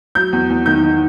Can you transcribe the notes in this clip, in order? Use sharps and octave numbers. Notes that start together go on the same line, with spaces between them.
F#3 G6
E2
E2
D#3 G6
D#3